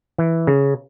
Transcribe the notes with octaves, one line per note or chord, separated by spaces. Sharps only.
E3
C#3